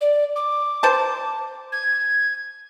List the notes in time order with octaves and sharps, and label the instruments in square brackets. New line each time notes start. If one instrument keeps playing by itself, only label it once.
[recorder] D5
D6
[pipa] C5 A5
[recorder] G#6